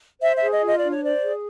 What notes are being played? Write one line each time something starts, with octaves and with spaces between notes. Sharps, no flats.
C5 E5
E5
G#4
D#5
F4 D#5
D4 D5
C#5
C5 D5
G#4